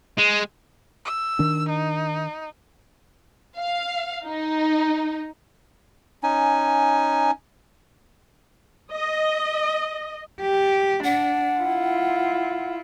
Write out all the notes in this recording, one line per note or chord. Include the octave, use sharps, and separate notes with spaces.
G#3
E6
D#3 D4
D#4
F5
D#4
C#4 D#4 G#5
D#5
G4
D4 F#5
E4 F4